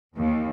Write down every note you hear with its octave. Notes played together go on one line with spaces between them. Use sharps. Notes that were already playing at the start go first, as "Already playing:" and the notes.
D#2